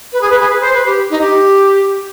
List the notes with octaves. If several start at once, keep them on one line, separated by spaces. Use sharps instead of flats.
B4
G#4
B4
G#4
B4
C5
B4
G4
D#4
G4